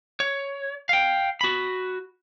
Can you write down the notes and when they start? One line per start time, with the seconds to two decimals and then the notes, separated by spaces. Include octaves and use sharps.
0.20 C#5
0.89 F5 G5
1.41 F#4 B5